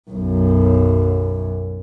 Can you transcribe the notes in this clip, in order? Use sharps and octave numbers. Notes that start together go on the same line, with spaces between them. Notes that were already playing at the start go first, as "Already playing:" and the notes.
B1 F#2